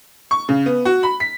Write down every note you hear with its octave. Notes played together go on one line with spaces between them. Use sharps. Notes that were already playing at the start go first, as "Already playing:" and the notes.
C#6
C#3
B3
F#4
B5
B6